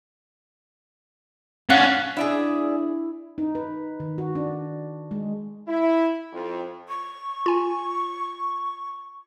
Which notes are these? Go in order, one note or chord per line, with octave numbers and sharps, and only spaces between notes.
C#4 D4 F5 F#5 F#6
D4 E4 G#4 D5 E5
D#4
B4
D#3
F#4
D4
G#3
E4
F2
C#6
F4 G#5